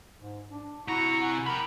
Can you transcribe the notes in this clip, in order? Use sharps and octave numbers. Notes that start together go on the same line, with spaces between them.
G#2
D4
C3 E4 F#4 A#5 C#6
F#5 G#5
E4 A#4 G5 B5